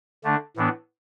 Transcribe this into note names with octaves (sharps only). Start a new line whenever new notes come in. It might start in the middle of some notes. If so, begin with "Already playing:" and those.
D3 A3 D4
A2 E3 B3 D4